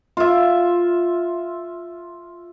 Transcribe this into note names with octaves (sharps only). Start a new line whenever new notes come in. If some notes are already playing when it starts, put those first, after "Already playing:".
F4 E5